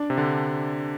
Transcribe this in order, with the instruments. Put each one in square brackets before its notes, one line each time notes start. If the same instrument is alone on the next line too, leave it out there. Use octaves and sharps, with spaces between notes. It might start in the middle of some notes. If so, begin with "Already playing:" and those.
Already playing: [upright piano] D4
[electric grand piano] C3
D3